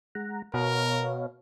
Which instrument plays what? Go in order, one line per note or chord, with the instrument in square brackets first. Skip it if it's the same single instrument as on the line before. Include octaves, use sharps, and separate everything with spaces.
[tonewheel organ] G#3 F#5 A#5
[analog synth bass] B2 [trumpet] A#4 [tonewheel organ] C#5 F5